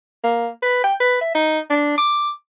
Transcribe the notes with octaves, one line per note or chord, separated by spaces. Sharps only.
A#3
B4
G5
B4
E5
D#4
D4
D6